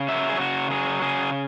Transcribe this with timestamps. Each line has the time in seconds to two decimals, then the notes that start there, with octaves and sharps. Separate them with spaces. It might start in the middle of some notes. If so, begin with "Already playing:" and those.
Already playing: C#3
0.08 F#3 E5
0.29 G#4
0.39 C#3 F#4
0.70 F#3 G#4
1.02 C#3 G#4